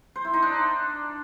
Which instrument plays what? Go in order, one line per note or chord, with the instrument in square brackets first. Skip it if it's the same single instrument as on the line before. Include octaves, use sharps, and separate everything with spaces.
[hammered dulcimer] C5
E4
D#4
D4